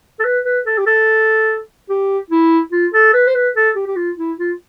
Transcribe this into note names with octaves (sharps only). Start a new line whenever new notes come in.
A4
B4
B4
A4
G4
A4
G4
E4
F4
A4
B4
C5
B4
A4
G4
G4
F4
E4
F4